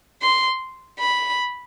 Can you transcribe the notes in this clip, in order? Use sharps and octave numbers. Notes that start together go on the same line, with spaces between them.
C6
B5